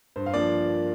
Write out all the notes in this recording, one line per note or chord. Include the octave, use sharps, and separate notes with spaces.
G2 C5
F5
F3 A#3 D4 D5